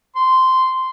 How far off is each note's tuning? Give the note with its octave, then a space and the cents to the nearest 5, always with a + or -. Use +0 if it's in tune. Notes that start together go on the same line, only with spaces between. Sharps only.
C6 -10